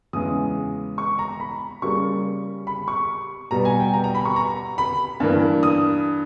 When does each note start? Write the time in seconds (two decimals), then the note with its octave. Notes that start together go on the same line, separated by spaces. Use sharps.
0.13 E2 C#3 G#3 D#6
0.98 C#6
1.19 A#5
1.40 B5
1.82 C#3 G3 A#3 C#6
2.67 B5
2.88 C#6
3.51 B2 G3 B3 A#5
3.65 G#5
3.79 G5
3.94 A#5
4.04 A#5
4.15 B5
4.25 C#6
4.36 A#5
4.78 B5
5.20 G2 E3 A#3
5.63 D#6